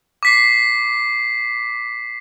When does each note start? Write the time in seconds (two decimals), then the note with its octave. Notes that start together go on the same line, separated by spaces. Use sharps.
0.23 D6 B6 C7